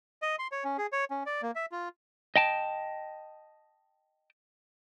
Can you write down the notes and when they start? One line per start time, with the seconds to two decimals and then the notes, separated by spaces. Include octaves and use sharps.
0.22 D#5
0.39 C6
0.52 C#5
0.64 C#4
0.78 G#4
0.92 C#5
1.10 C#4
1.26 D5
1.42 A#3
1.55 E5
1.72 F4
2.36 D#5 G5 A5